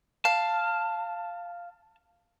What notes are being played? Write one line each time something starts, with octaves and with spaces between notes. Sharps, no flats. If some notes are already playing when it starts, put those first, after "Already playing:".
F5 A5